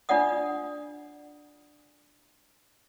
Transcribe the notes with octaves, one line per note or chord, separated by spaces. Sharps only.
D4 F4 D5 F#5 D#6